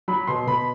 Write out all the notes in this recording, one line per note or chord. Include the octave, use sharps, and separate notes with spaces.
F#3 B5
B2 C6
B2 B5